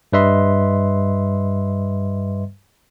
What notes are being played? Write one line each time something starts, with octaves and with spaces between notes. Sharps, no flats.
G2 G3 B4 D#5 E5 C6